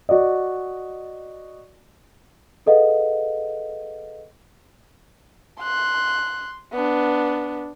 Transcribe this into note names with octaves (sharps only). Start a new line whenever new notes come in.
F#4 D5 D#5
G#4 A4 B4 D#5 F5 F#5
C6 F#6
B3 D4